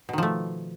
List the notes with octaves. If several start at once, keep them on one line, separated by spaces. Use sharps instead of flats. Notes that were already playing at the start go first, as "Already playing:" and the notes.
B2 D#3 F3 A3